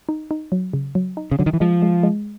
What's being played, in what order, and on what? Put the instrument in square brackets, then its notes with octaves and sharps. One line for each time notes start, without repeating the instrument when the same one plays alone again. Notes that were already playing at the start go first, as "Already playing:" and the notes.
[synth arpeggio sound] D#4
D#4
F#3
C#3
F#3
D#4
[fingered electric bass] C#3
[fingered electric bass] D3 [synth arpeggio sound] F#3
[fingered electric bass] D#3
E3
[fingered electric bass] F3 [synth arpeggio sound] G#3
[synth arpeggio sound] G#3
G#3